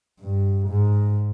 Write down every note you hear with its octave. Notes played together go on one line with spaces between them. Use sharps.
G2
G#2